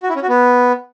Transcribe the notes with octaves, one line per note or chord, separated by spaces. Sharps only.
F#4
E4
C#4
F#4
B3